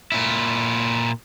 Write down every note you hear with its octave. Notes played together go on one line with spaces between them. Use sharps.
A#2 E4